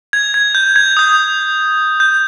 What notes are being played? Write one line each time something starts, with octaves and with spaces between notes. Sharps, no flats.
G#6
G#6
G6
G#6
D#6 G6
G6